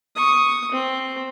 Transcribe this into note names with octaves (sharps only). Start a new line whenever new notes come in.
C#6 D#6
C4